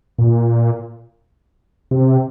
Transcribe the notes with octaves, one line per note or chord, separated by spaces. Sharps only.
A#2
C3